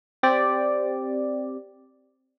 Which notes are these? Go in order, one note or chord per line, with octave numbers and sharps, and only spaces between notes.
C4 G4 D5